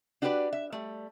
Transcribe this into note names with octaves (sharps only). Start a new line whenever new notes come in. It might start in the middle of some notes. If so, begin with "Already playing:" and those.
D4 F#4 G4 B4 C5 D5
E5
G3 A3